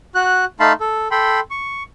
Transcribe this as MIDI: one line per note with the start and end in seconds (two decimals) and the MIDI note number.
0.15 0.45 66
0.15 0.45 90
0.60 0.73 57
0.60 0.73 63
0.60 0.73 77
0.60 0.73 81
0.60 0.73 83
0.60 0.73 84
0.80 1.08 69
1.11 1.40 69
1.11 1.40 79
1.11 1.40 83
1.11 1.40 84
1.51 1.83 85